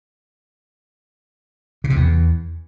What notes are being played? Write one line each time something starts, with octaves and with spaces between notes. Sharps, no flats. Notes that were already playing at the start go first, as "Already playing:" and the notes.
C#3
C3
E2